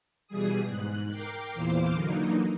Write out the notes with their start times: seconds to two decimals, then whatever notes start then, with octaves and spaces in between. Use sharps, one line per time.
0.27 B2 E3 G3 G#4 D#6
0.67 G#2 F#6
1.09 A#4 G5 D6 C7
1.54 E2 A#2 E3 C5 F5 D6
1.92 D3 E3 F#3 A#3 D#4